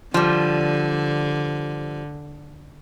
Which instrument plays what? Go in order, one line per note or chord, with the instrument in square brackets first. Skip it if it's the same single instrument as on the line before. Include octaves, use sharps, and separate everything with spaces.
[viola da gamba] D3 [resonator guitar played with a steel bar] F3 G3